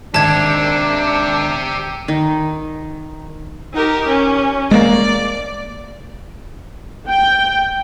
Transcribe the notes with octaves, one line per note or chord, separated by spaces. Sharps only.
G#1 D#3 D4 G4 E5 A5 G#6
D#3
D#4 G4 A#4
C#4
G#3 A#3 D5
G5